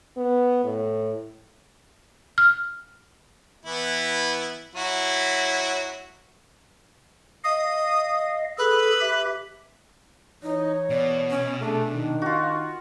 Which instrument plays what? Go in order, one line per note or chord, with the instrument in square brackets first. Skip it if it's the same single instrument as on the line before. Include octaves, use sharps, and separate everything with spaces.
[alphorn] B3
A2
[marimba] F6
[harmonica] E3 B3 E4
F#3 E4 F#4
[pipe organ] D#5 F5 [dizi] D#6
[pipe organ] G#4 A4 [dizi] B4
[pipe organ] G4 E5
[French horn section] E3 C#5 [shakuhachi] D#4
[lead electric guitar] B2 [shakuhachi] D5
[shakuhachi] C#4
[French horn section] A3 G#4 [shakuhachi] D4
[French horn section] D#3
[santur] F4 F#4